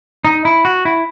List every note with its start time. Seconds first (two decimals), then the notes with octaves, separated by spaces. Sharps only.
0.25 D#4
0.45 E4
0.65 F#4
0.85 E4